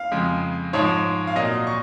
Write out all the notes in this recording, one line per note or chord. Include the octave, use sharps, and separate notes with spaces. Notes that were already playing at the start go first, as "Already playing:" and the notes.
Already playing: F5
F2 C#3 G#3
G#2 F3 G#3 C#5
F5
A#2 F#3 D#5
C#6